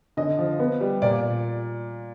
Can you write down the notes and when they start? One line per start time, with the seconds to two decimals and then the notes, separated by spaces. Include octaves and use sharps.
0.17 D3 D#5
0.39 F3
0.59 B3
0.80 G3
1.02 A#2 D5